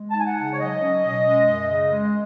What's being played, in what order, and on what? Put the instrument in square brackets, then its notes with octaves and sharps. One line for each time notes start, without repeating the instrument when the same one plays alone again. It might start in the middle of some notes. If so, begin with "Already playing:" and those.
Already playing: [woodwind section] G#3
A5
D#4 G#5
F#5
C#3
C#5
F#3 D#5
C#4
B2
G#3
F#2
C#3
G#3